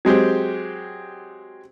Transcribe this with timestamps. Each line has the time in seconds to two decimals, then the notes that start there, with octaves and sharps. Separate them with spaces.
0.05 F#3 G#3 C4 G4